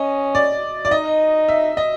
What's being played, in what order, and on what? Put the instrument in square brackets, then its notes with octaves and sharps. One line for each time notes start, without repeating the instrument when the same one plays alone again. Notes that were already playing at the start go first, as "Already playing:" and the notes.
Already playing: [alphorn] C#4 [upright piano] D#5
[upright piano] D5
D5
[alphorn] D#4 [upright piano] D#5
[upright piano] E5
D#5